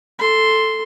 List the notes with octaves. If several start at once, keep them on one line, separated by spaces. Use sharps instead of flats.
A4 C6